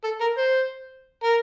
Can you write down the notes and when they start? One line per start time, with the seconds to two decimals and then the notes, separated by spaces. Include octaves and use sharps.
0.04 A4
0.21 A#4
0.38 C5
1.23 A#4